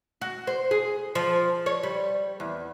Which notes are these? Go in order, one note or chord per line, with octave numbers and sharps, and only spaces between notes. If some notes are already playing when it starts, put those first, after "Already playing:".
F#4
C5
G#4
F3
C#5
G3
E2